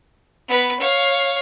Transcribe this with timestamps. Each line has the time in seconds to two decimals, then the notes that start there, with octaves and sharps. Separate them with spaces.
0.48 B3 B4
0.80 C#5 F5